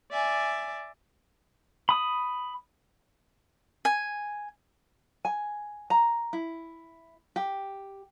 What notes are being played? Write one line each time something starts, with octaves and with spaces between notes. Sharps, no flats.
D5 E5 G#5
B5 D#6
G#5
G#5
A#5
E4
G4